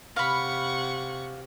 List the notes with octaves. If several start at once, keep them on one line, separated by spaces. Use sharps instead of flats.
C3 F5 F#5 B5 C#6